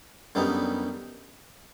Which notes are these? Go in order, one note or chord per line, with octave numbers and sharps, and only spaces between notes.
F#2 D3 G3 B3 D#4